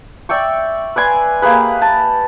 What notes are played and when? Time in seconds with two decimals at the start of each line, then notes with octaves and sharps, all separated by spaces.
0.29 D5 E5 G5 C#6
0.96 B4 D5 G#5 C6
1.42 A#3 G4 G#4 B4
1.82 A5